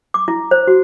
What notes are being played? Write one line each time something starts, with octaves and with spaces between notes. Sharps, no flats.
D6
E4
C5
F#4